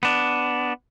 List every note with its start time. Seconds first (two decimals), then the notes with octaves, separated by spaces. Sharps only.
0.03 B3 D4